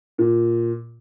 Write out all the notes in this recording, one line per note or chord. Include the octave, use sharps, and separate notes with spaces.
A#2